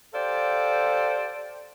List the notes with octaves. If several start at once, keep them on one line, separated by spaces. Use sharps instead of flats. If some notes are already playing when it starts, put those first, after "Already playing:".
G4 A4 C5 D5 F5